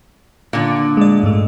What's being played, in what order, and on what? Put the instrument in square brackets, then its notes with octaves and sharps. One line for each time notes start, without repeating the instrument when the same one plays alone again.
[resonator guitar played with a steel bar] A#2 D3
[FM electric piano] G#3 D5
G#2 G#3 A3